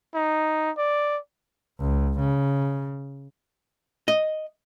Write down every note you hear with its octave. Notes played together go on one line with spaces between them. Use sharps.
D#4
D5
C#2
C#3
D#5